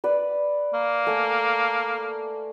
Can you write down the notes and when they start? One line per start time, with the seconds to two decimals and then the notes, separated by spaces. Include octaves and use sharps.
0.04 B4 D5
0.73 A#3
1.07 A3 G#5 E6